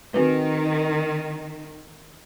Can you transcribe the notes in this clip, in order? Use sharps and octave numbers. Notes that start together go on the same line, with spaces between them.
D#3 C4 F#4 B4